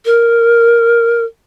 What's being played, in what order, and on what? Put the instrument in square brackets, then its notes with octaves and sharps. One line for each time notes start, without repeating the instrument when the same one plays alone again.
[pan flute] A#4